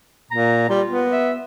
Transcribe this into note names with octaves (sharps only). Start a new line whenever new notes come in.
A#2 A#5
G3 F4
B3
E5